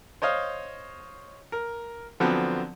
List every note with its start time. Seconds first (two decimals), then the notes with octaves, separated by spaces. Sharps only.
0.22 C5 C#5 D#5 F5
1.52 A#4
2.20 D3 F3 F#3 B3 C4